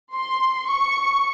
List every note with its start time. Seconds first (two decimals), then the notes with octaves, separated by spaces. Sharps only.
0.14 C6
0.68 C#6